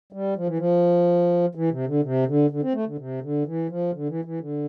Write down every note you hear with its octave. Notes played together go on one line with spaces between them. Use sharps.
G3
F3
E3
F3
E3
C3
D3
C3
D3
D3
C4
A3
D3
C3
D3
E3
F3
D3
E3
E3
D3